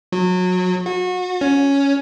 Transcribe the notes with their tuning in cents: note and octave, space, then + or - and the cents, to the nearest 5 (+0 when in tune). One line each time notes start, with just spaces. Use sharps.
F#3 -25
F#4 -30
C#4 +5